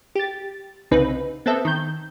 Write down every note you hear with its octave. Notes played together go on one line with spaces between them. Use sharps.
G4 A6
C2 C#3 C4 D#4 B4
B3 C4 A4 E5
D#3 G6